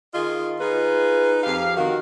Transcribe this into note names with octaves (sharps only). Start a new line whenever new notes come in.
D#3 F4 G#4 D#5
D#4 F4 G#4 B4
F2 G4 F5
D#3 F#4